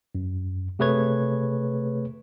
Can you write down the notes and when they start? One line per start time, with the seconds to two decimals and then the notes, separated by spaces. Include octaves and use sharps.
0.15 F#2
0.79 C3 A3 G#4 B4 C#5 G#6